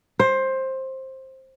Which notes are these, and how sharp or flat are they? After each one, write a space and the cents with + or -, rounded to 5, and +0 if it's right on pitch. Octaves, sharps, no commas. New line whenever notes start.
C5 +15